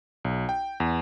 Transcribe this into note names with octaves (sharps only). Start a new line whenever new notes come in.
B1
G5
E2